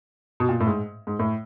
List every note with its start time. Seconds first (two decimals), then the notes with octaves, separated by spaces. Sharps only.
0.40 B2
0.49 A#2
0.60 A2
0.67 G#2
1.07 G#2
1.19 A2